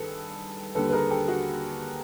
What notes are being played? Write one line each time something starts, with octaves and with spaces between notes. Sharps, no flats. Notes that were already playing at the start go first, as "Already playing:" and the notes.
Already playing: G2 D#3 G#4 A4 B4
D#2 D3 G3 A4 B4
B4
G#4 A#4
G4 A4
F#4 G#4